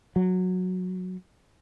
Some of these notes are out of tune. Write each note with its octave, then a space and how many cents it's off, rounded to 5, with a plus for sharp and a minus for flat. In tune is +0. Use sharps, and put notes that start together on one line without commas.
F#3 -10